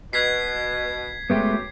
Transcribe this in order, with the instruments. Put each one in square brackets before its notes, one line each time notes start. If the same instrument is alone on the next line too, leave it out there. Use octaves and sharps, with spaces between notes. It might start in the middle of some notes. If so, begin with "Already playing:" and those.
[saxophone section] B2 [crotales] G#6 B6 C7
[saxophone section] F#2 F#3 G4 [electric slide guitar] G#3 A3 B3